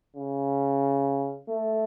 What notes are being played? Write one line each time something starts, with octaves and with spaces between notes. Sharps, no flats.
C#3
A3